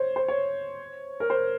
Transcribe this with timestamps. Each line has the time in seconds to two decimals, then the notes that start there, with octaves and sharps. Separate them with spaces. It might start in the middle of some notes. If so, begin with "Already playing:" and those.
Already playing: C5 C#5
0.16 C5
0.28 C#5
1.20 A#4
1.30 C5